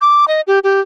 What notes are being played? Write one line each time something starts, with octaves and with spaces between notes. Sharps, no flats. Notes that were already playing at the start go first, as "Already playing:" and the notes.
D6
D#5
G4
G4